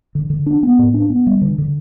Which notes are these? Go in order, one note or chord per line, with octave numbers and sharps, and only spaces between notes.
D3
D3
D4
B3
A2
D4
B3
G3
D3
D3